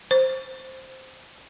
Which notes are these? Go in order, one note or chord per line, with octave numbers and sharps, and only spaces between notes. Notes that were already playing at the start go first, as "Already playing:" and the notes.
C5